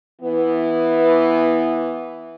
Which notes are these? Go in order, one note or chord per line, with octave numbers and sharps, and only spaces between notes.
E3 B3